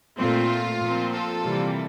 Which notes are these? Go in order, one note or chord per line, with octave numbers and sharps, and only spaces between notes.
A#2 A3 C4 F4
A#2 F3 C4
F4 A4
C3 E3 G3 A#3